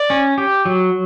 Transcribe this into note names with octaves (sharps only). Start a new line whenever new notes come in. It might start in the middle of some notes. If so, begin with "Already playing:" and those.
Already playing: D5
C#4
G4
F#3